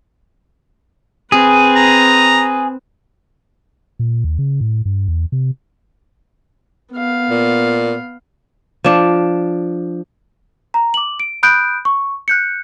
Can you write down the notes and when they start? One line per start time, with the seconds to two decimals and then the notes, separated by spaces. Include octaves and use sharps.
1.32 C4 G#4 B4
1.76 A#5
3.99 A#2
4.24 D#2
4.39 C#3
4.61 A2
4.85 G2
5.08 E2
5.32 C3
6.93 B3 F5
7.30 A#2
8.84 F3 D4
10.74 A#5
10.94 D6 F#7
11.20 D7
11.43 B5 D#6 F#6 G6 D7
11.85 C#6
12.28 F#6 G6 C#7